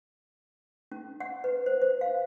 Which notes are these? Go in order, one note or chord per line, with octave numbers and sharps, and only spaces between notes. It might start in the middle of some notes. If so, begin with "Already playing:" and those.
C#4
F#5
B4
C5
C5
F5